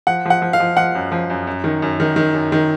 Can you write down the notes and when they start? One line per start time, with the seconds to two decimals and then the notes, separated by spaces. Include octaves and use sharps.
0.07 F3 F#5
0.25 F3 F#5
0.42 F3
0.53 F5
0.60 F3
0.77 F3 F#5
0.95 F#2
1.12 F3
1.30 F#2
1.47 F#2
1.64 D#3
1.82 F#2
2.00 D#3
2.16 D#3
2.35 F#2
2.52 D#3